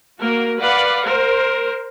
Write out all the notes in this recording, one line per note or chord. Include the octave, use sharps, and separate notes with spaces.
A#3 F#4 A#4
B4 D5 F5 F#5
A#4 C5